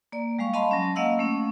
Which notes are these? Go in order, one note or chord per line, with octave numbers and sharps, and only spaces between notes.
A#3 D5
G3 G#3 F5 C#6
D#5 F5 A5 B5 C6
F#3 C#4
A#3 D#5 F5 F#5 E6
A3 C#4